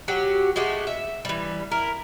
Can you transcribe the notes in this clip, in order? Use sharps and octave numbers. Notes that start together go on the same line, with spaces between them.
F#3 F#4 G4
G#3 A3 F#4 G4
E5
E3 G3
E4 A#4